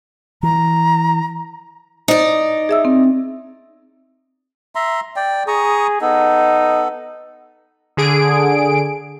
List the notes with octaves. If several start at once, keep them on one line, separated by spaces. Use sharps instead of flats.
E3 A#5
D#4 C5 D5
G#4 E5 E6
C4
E5 A#5 C6
D5 G5
G#4 A#5 C#6 D#6
B3 D#4 A4
D3 G#4 D7